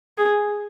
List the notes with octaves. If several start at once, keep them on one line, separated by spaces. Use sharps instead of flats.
G#4